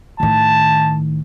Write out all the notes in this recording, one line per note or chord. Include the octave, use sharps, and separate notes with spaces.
A2 D#3 A5